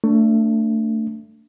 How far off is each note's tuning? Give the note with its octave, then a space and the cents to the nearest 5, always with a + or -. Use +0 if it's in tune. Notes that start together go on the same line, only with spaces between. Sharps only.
A3 +25 D4 -10